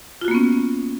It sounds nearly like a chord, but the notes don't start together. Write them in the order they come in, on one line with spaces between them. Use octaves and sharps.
F4 F#4 A#3 B3 C#4